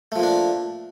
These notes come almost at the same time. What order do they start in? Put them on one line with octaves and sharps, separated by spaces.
A3 F3 A#3 D4